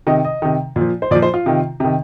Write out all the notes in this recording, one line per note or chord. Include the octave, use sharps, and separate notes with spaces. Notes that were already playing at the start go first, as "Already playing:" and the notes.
C3 D#3 D#5
D#5
C3 D#3
A#2 F3
C5
A#2 F3 D5
C5
F4
C3 D#3
C3 D#3